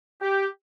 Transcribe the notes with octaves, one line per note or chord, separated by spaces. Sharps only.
G4